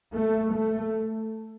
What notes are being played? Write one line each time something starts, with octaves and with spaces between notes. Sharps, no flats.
A3
A3